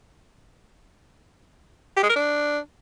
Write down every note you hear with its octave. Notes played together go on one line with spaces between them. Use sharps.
G4
G#3
A#4
D4